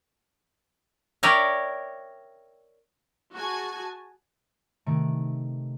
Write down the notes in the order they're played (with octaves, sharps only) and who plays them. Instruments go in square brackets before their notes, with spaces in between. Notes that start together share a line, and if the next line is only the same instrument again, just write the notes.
[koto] A#4 C#5 D5 E5 G5
[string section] F#4 G#4 G#5 A5
[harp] C3 D#3 A3 D7